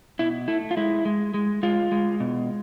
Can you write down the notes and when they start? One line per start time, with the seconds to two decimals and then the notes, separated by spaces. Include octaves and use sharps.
0.19 B2 E4
0.48 A3 E4
0.71 F4
0.77 G#3 E4
1.05 G#3
1.34 G#3
1.63 G#3 F4
1.92 G#3
2.20 B2